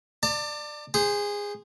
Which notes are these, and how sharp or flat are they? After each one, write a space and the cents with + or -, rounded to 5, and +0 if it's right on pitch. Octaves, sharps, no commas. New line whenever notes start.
D5 +20 A5 +45
G#4 -20 C5 +0